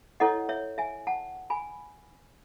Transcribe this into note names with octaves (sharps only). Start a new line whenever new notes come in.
E4 A4 C#5 D#5 F#5
C#5 E5
E5 G#5
F#5 A5
G#5 B5